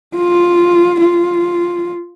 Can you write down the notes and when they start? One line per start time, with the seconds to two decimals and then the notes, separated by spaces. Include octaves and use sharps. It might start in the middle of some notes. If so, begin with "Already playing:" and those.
0.15 F4
1.01 F4